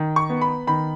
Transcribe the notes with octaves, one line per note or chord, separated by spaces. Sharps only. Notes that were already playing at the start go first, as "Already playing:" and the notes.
Already playing: D#3
C#6
B3
B5
D#3 B5